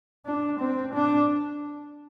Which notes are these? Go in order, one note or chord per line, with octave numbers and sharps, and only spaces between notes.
D4
C4
D4